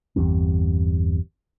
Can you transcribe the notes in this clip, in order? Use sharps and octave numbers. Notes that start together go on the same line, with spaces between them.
G1 E2 G3 C4